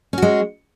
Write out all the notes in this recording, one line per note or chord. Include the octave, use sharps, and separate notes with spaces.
G#3 C#4 F#4